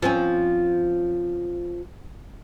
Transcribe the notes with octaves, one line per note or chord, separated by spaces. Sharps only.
F3 C4 C#4